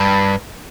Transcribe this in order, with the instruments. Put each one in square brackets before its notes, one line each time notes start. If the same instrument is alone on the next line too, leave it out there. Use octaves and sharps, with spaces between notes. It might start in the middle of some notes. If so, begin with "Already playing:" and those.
Already playing: [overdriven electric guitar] G2